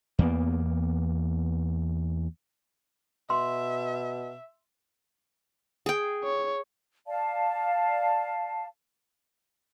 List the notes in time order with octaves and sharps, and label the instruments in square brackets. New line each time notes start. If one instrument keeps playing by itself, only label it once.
[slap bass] E2 A#3 B3
[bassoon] B2 [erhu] E5 [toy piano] C6
[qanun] G#4 G5
[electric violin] C#5
[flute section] D5 F5 A5